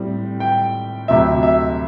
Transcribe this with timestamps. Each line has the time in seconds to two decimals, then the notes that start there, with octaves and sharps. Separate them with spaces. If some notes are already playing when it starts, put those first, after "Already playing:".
Already playing: A2 G3 C4
0.40 G5
1.08 D2 C3 F#3 E5
1.43 E5